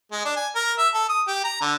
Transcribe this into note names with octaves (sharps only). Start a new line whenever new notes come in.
G#3
D4
G#5
A#4
E5
A4
D#6
G4
A#5
D3